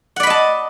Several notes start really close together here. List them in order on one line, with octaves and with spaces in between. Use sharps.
F#5 D5 B5 D#5 A5